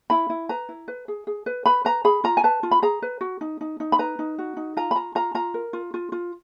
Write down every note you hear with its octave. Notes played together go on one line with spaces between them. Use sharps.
E4 B5
E4
B4 A#5
E4
B4
G#4
G#4
B4
B4 B5
B4 A#5
G#4 B5
F4 A#5
G#5
B4 A5
F4
B5
G#4 A#5
B4
F#4
D#4
D#4
D#4
B5
B4 A#5
D#4
F#4
D#4
F4 A#5
B5
F4 A#5
F4 A#5
F4 A#5
A#4
F4
F4
F4